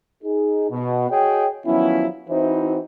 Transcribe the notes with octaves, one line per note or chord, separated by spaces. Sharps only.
D#4 G#4
B2
F#4 G#4 C#5 D#5 G5
D#3 F3 F#3 B3 C#4 E4
E3 C4 D#4 E4 F#4 C5